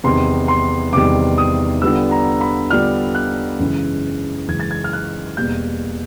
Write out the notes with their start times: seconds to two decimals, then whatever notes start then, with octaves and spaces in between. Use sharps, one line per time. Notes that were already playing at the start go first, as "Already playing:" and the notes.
0.04 E2 C3 D#3 G3 C6
0.48 C6
0.93 E2 C3 D#3 G3 D6
1.38 D#6
1.81 D3 G3 B3 D4 F4 E6
2.11 A#5
2.41 B5
2.70 D3 G3 B3 D4 F4 F6
3.15 F#6
3.59 F#2 C#3 E3 G#3
4.48 F#2 C#3 E3 G#3 G#6
4.60 A6
4.71 G#6
4.84 F6
4.93 F#6
5.37 E2 B2 G3 A#3 G6